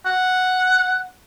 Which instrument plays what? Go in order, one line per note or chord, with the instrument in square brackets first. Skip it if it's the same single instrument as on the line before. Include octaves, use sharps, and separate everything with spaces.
[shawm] F#5